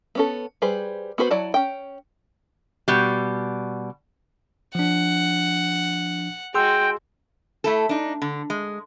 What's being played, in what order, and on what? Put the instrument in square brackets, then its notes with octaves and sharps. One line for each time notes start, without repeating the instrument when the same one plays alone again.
[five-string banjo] B3 C#4 A4
G3 G#4 B4 C5
B3 F#4 B4 C5
F#3 E4 D5 F#5 A5
C#4 G5
[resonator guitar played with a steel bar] B2 G3
[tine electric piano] F3 D4 [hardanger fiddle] F#5
[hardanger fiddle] G#3 F#4 [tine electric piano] G#4 C6 E6 [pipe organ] G5
[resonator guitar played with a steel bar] A3 E4 A4
D4 D#4
D3
G#3